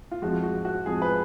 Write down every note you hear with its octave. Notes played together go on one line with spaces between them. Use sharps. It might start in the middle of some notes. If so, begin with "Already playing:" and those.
F4
F2 F3 G#3 F#4
F#4
F#4
F2 F3 G#3 G#4
B4